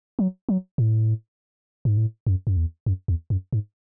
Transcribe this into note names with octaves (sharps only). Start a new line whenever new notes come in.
F#3
F#3
A2
G#2
A2
F#2
F#2
E2
F#2
E2
F#2
G#2